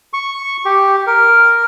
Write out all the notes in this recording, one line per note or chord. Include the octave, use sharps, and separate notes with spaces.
C#6
G4
A#4